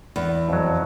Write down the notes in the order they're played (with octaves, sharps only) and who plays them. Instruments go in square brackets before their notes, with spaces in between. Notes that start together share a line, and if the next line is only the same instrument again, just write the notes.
[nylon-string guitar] E2
[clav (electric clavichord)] F2 F#3